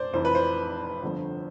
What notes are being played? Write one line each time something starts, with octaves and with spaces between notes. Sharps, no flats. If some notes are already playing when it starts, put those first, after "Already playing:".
Already playing: F1 F2 C5 D5
F1 F2 E3 C5
B4
C5
G1 F2 D3 F3